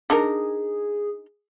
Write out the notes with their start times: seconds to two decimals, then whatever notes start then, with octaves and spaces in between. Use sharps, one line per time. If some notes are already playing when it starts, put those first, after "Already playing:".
0.10 D4 D#4 G#4 A#4